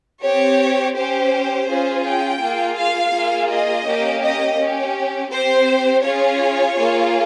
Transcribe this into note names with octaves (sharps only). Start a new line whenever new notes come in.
C4 G4 C#5
C#4 G4 C5
C#4 F4 G#4
G5
A#3 F4 G#4
F5
A#3 F4 G#4
D#5
A#3 C#4 G4
D#5
C#4 G4
C4 G4 C5
C#4 F4 G#4 C#5
A#3 F4 G#4